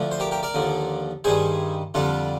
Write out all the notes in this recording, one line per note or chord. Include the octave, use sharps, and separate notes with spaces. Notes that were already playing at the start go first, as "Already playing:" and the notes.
Already playing: D2 D3 F3
C5
G4 A#4
G4 A#4
A#4 D5
D#2 D3 F3
G2 D#3 G3 G#4 C5
F2 D3 G3 D4 F4